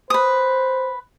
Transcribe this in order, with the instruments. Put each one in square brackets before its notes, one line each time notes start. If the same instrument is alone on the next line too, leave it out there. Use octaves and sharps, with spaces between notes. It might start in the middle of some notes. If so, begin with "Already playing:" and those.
[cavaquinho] B4 D#6 [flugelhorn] C5